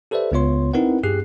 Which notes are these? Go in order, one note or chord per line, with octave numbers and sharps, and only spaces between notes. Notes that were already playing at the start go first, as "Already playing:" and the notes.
G4 A4 B4 C5 D5 E5
C#2 C#3 B3 F4 C#5 C6
C4 D#4 E4 A#4 B4 F#5
G2 G4 G#4 F#6 C7